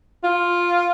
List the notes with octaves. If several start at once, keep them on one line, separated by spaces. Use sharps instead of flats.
F4